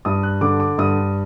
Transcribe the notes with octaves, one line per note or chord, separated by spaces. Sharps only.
G2 D#6
F#6
D3 D6
D6
G2 D#6